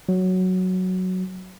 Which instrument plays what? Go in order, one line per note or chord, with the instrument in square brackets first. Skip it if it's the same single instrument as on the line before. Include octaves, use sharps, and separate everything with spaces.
[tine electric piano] F#3